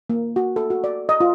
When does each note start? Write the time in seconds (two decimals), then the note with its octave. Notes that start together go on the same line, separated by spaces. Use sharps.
0.10 A#3
0.36 F#4
0.56 A4
0.70 F#4
0.84 D5
1.09 D#5
1.20 F4